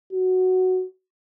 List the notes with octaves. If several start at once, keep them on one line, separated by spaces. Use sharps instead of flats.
F#4